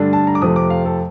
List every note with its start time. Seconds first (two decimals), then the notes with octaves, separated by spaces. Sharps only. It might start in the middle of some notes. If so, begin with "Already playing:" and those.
Already playing: G2 D3 A3 D4
0.13 A5
0.27 A#5
0.35 D6
0.42 F2 C3 F3 A3 D#6
0.56 D6
0.70 F5
0.85 A4